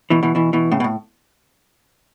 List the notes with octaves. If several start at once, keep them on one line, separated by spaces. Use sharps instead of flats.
B2 E3
B2 E3
B2 E3
B2 E3
A2 C#3
B2
A2